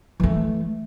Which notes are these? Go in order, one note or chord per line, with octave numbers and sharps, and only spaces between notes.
E3 A3